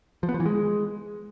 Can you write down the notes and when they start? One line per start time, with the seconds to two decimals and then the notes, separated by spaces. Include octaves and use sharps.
0.23 F3
0.29 B3
0.34 F3
0.40 E3
0.46 G#3